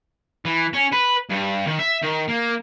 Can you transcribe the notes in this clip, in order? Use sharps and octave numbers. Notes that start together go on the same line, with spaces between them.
E3
C#4
B4
G2
D#3
E5
D#3
A#3